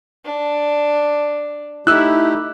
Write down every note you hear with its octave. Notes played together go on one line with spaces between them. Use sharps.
D4
A3 D#4 E4 G4 E6 F#6